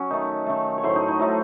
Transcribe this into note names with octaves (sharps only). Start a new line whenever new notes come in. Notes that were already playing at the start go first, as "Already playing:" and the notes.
Already playing: F#3 C#4
D#3 A3 D#4
D#3 A3
C#5
A2 F#3 A3 C5
D#4
D#4
A2 F#3 A3 D#4